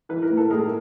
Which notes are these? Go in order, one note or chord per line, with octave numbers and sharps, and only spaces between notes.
E3 B4
A#4
A2
A4
A2 G#4 A#4